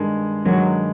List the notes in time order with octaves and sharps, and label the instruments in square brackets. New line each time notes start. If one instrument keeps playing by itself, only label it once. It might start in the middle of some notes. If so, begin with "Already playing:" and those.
Already playing: [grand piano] G2 D#3 G#3
[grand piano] G2 D#3 G#3 [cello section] F#3